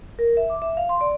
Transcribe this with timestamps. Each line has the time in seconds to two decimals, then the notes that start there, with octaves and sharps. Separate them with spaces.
0.19 A#4
0.37 E5
0.50 D6
0.62 E5
0.77 F5
0.89 C6
1.01 D5